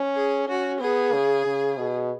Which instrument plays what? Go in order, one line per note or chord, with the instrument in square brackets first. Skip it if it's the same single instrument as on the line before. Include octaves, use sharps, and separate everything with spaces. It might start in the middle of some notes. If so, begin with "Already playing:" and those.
Already playing: [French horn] C#4
[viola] G#4
[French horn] C#4 [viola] F#4
[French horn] B3 [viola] G#4
[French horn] C#3
C#3
B2